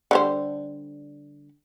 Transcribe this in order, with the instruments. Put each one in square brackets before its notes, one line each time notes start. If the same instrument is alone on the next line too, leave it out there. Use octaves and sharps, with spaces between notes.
[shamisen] D3 G3 C5